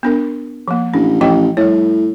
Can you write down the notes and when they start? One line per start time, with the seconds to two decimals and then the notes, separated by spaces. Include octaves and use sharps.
0.03 B3 D4 A#4
0.68 F3 A#3
0.94 A1 D4
1.21 A1 F3 D#5 G5
1.57 A2 G3 C#5